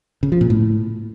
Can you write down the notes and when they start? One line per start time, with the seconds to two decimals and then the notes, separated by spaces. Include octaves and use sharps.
0.23 C#3
0.32 F3
0.41 A#2
0.50 A2